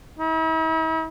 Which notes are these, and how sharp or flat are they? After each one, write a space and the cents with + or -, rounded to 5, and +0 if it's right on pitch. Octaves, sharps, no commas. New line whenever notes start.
E4 -45